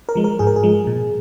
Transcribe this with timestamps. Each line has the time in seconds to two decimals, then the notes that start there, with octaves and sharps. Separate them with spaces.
0.09 A#4
0.15 F3 G#3
0.24 A#4
0.39 G#2 G#4
0.47 A#4
0.56 G#4
0.63 F3 G#3
0.87 A#2